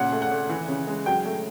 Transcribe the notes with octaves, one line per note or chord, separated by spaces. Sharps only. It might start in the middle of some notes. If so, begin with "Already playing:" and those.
Already playing: A#2 C#3 F#5
A3
F#5
A3
E3
C#3
G#3
F#3 G5
A3